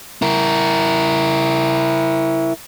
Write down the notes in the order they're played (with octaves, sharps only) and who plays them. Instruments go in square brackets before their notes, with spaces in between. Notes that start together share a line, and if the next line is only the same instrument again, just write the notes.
[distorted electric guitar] E4 A#4